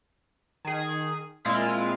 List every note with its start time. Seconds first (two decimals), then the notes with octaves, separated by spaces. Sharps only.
0.65 D#3 G#4
1.45 A#2 G#3 C4 E4 F4 F6